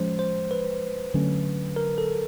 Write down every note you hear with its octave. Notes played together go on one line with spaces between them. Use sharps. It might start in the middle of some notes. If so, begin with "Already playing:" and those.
Already playing: F3 G#3 C#4 C5
C5
B4
D3 F#3 A3 C#4
A#4
A4